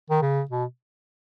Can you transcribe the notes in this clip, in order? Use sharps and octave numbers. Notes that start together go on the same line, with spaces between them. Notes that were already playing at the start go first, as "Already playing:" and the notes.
D#3
C#3
B2